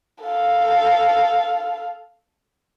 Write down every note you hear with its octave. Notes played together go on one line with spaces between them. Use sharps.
A4 F5